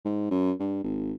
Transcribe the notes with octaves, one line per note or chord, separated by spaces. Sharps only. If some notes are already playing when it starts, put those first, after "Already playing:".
G#2
F#2
G2
G#1